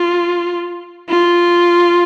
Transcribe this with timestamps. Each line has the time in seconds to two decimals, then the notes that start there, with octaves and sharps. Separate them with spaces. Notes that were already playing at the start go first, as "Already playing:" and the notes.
Already playing: F4
1.09 F4